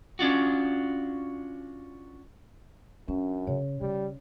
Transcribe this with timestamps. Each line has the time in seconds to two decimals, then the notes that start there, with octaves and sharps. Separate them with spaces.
0.19 C#4 D4 F4 F#4
3.08 F#2 C#4 D4
3.47 C#3 C#5
3.81 C#3 G3